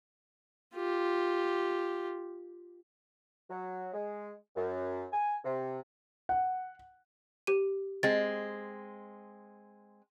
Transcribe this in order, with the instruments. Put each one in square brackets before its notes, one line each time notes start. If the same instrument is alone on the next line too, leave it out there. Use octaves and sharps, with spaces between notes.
[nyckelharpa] F4 G4
[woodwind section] F#3
G#3
F#2
G#5
C3
[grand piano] F#5
[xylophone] G4 D#7
[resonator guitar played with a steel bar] G#3 C4 [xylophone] A6